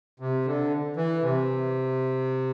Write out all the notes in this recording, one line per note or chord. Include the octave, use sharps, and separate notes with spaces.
C3
D3
E3
C3